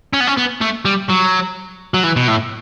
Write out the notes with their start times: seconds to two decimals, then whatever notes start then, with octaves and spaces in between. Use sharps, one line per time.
0.13 C#4
0.20 B3
0.27 C#4
0.37 B3
0.62 A3
0.85 G3
1.09 F#3
1.94 F#3
2.03 E3
2.16 B2
2.28 A2